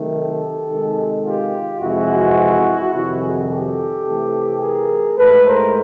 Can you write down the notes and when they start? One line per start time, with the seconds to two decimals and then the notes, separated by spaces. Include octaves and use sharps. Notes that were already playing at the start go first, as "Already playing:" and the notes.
Already playing: C3 D#3 F#3 A3
0.11 G4 A4
0.68 C3 D#3 G#3
1.24 F4 G4
1.81 F2 C3 E3 G#3 E4 F#4
2.92 F2 C3 D#3 G3 E4 F#4
3.21 F#4 G#4
3.49 G4 A4
4.05 C3 E3 A3
4.61 G#4 A#4
5.17 G#2 E3 A3 A4 B4
5.45 A#4 C5